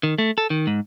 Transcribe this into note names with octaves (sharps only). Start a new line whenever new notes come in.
D#3
A3
A4
D#3
G#2